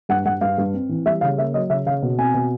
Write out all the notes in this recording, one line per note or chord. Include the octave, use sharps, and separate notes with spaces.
G2 F#5
G2 F#5
G2 F5
G2
C4
E3
G3 E5
C#3 F5
A#3 E5
F#3 D#5
C#3 E5
C#3 F5
B2
C4 G#5
B2